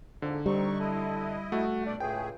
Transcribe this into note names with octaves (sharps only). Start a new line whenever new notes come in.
F2 G#2 D3
G3 C4 D#4 C#6
E4 A4 D#5
A3 F#4
B2 D4 D5
C#2 A2 A3 G#4 G5